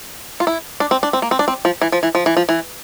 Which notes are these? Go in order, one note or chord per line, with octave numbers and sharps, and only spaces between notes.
F4
E4
D4
C4
D4
C4
A#3
C4
D4
C4
F3
E3
F3
E3
F3
E3
F3
E3